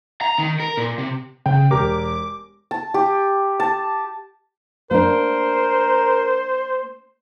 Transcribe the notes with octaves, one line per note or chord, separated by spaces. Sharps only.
A#5
D#3
A#4
A#2
C3
C#3 G5
E1 G4 A#4 D6
A5
G4
A5
A#3 D4 A#4 C5